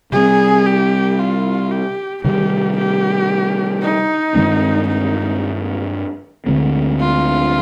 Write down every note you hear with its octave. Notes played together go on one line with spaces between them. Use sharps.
C3 G3 C4 G#4
G4
F4
G4
C3 D#3 G3 G4
G4
D#4
G2 D#3 G#3 C4
D#4
D2 D3 G#3 C4
F4